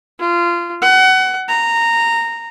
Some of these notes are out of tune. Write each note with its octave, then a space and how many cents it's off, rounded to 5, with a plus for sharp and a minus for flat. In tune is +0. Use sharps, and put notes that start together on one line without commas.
F4 -20
F#5 +25
A#5 -15